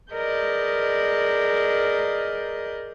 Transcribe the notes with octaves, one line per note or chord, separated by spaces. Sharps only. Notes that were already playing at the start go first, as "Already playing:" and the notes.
G#4 A#4 B4 D5 D#5 G6